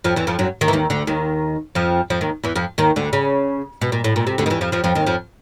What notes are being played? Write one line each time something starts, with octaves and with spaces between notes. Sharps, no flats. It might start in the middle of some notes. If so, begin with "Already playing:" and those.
F2 F3
E2 E3
F2 F3
F#2 F#3
D#2 D#3
E3
D#2 D#3
D2 D3
D#2 D#3
F2 F3
F2 F3
D#2 D#3
E2 E3
F2 F3
D#2 D#3
D2 D3
C#3
B2
A#2
A2
A#2
C3
D2 D3
D#3
E2 E3
F2 F3
F2 F3
F2 F3
D#2 D#3
F2 F3